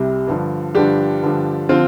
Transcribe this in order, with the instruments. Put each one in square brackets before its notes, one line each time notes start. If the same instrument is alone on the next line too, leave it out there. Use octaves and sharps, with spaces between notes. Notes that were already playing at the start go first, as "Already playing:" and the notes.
Already playing: [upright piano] C2 C3 G3
G2 D3 F3
G2 D3 F3 D4 G4
G2 D3 F3
D3 F3 C4 F4